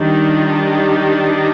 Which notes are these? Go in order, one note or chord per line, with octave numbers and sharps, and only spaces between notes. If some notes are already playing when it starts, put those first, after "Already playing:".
Already playing: D#3 G3 D4
F4
G4